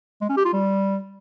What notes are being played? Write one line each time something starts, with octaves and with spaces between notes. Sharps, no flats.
G#3
C#4
G4
F4
G3